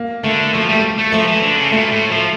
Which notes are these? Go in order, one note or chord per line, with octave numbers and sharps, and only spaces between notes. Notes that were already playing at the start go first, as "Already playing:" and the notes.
Already playing: A#3
D3 A3
F3 A3
G3 A3
A3
F3 A3
E3
D3
C#3
A#2 A3
A2
F3 A3